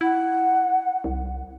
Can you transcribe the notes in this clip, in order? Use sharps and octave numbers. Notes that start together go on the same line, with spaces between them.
E4 F#5
C2